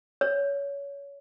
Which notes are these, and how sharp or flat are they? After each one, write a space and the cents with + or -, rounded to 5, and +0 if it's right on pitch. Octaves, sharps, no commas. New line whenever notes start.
C#5 +25